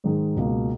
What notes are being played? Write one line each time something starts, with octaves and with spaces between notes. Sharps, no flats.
G#2 D#3 G#3 D#4
C#2 B2 A#3